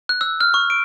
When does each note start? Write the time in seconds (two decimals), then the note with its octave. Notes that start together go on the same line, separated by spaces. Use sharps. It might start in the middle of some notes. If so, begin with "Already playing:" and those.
0.09 F#6
0.21 E6
0.41 F6
0.54 C#6
0.70 D7